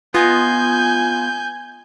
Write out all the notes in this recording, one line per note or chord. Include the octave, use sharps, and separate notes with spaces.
B3 F4 D#5 G#5 G6